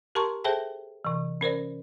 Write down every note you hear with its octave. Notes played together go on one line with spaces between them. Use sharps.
G4 A#4 A5 A#5 C6 C#6
G#4 A4 C5 E5 G5 A5
C3 E3
C#4 A#4 C5 D5